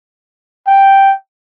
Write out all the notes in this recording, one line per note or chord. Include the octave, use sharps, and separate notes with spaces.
G5